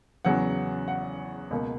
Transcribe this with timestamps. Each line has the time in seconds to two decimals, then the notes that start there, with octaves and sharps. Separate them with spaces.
0.25 E2 C#3 F#3 B3 F#5
0.88 F#5
1.51 C#2 B2 A#3